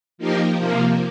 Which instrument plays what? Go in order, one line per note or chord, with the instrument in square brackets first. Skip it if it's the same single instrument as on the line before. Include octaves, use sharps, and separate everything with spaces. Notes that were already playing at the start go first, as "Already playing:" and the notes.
[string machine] F3 A#3 D#4 G4 A#4
C3 F3 A#3